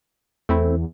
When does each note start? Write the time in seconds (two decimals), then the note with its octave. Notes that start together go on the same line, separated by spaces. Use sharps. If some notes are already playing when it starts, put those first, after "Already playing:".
0.49 E2 A3 C4 E4